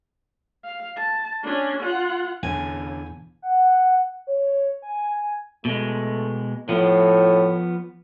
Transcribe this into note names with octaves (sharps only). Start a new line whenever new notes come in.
F5
A5
C#4 D4
F4 F#5
E2 D3 C#4 G#5
F#5
C#5
G#5
G#5
B2 G#3 A3
A2 F3 B3